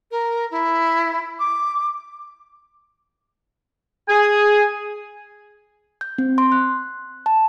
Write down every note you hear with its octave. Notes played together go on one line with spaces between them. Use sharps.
A#4
E4
D6
G#4 G#5
G6
C4
C6
F#6
A5